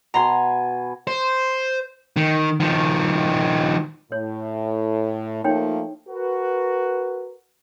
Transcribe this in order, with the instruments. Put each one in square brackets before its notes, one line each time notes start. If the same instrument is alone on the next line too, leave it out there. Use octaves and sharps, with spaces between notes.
[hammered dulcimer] B2 G#5 [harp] A#5 C6
[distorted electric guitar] C5
D#3
D#3 F3
[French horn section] A2 [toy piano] C#5
[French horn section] F3 A3 A#3 [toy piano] D#4 C#5 G5
[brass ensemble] F#4 A#4 B4